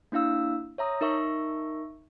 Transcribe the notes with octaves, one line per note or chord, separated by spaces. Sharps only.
A#3 D4 E4 F5 E6
C#5 E5 A#5 D#6
D#4 A#4 E5 C#6